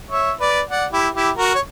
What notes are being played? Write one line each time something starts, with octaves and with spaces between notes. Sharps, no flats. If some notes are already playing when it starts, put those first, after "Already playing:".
C#5 E5
B4 D5
D5 F#5
E4 G4
E4 G4
F#4 A#4
C#5